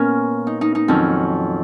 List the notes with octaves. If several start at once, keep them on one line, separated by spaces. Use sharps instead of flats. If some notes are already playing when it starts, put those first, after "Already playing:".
Already playing: A#2 B3 C#4 A#4
D#4
D#4
D#4
F2 D#3 F#3 C#4